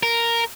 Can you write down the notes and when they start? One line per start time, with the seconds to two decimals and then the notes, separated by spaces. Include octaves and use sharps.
0.03 A#4